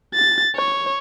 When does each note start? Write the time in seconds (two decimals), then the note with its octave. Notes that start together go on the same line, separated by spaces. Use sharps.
0.14 A6
0.56 C#5